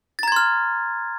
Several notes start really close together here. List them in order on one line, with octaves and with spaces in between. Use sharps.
A6 A#5 G#6 C6 F6